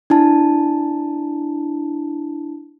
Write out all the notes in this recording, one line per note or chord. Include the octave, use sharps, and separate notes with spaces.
D4 E4 A5